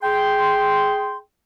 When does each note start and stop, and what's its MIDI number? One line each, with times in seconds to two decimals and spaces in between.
0.02 1.18 68
0.02 1.18 79
0.02 1.18 84